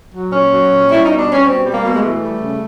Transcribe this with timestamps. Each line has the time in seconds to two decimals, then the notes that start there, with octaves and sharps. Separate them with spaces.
0.12 F#3
0.31 A#2 C#4
0.50 F#3
0.69 A#2
0.88 G3 E4
1.05 B2 D#4
1.18 D4
1.26 G3
1.32 C#4
1.45 B2 C4
1.65 G3
1.73 A#3
1.84 B2
1.95 G#3
2.02 E3 A3
2.21 G3
2.41 C#3